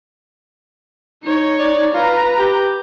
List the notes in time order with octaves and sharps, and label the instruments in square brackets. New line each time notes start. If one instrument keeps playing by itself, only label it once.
[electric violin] D#4 C#5
[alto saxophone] D5
[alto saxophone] F4 [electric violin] B4 A#5
[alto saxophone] G4